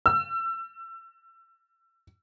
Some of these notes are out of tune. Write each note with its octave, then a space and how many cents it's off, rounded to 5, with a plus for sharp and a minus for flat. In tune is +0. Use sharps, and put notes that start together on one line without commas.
E6 +30